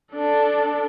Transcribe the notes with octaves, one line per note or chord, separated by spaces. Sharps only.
D4 A4